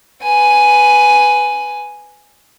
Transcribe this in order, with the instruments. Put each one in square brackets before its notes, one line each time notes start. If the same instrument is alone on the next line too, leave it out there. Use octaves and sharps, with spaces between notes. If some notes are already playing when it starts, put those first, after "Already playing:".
[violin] B4 G#5